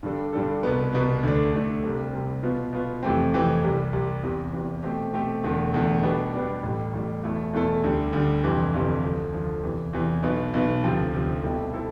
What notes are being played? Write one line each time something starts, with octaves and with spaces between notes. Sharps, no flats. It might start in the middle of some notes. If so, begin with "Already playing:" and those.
G2 D3 G3 D4 A4
G2 D3 G3 D4 A4
C2 B2 B3
C2 B2 B3
D2 D3 A3 D4
D2 D3 A3 D4
C2 C3 G3 C4
C2 C3 G3 C4
B2 B3 F4
B2 B3 F4
F2 C3 E3 A3 C4
F2 C3 E3 A3 C4
C2 C3 G3
C2 C3 G3
E2 C3 E3
E2 C3 E3
B2 A3 C4 G4
B2 A3 C4 G4
E1 E2 D3 A3
E1 E2 D3 A3
B2 G3 B3 D4
B2 G3 B3 D4
A1 A2 G3
A1 A2 G3
E2 B2 A3 E4 A4
E2 B2 A3 E4 A4
D2 D3 G3
D2 D3 G3
G1 F2 C3 E3
G1 F2 C3 E3
D2 D3 F3
D2 D3 F3
E2 C3 E3
E2 C3 E3
B1 B2 B3
B1 B2 B3
D2 C3 F3 C4
D2 C3 F3 C4
B2 G3 C4 E4 A4
C4 E4 A4